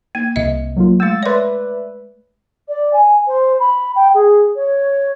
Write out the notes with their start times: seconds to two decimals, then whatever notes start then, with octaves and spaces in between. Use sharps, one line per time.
0.15 A#3 G#6
0.36 C2 C3 D#5 E5
0.76 F#3 A#3 F4
1.00 G#3 A3 E6 A6
1.23 B4 C#5 D5 E5 C6
2.68 D5
2.93 G#5
3.27 C5
3.60 B5
3.96 G5
4.14 G#4
4.56 C#5